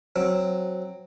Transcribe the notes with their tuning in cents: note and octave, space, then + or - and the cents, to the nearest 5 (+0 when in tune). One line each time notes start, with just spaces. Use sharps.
F#3 +0 C4 +5